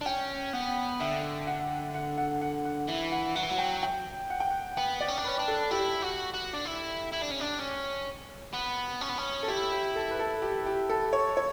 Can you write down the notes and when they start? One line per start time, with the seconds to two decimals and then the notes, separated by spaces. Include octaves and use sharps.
0.01 D4
0.06 C#4 G5
0.53 B3 F#5
1.00 D3 E5
1.47 F#5
1.94 F#5
2.18 F#5
2.41 F#5
2.65 F#5
2.88 E3 E5
3.12 F#5
3.35 F#3 F#5
3.43 E3
3.50 F#3
3.59 G5
3.83 G5
4.30 F#5
4.40 G5
4.50 F#5
4.77 B3 G5
5.01 D5
5.08 C#4
5.18 D4
5.24 C#4 B4
5.39 D4
5.48 A4
5.71 E4 G4
6.02 F#4
6.34 F#4
6.54 D4
6.65 E4
7.13 E4
7.22 D4
7.31 C#4
7.41 D4
7.60 C#4
8.53 B3
9.01 C#4
9.09 B3
9.18 C#4
9.43 A4
9.48 E4 G4
9.72 G4
9.96 A4
10.11 B4
10.19 A4
10.42 G4
10.66 G4
10.89 A4
11.13 C#5
11.37 C#5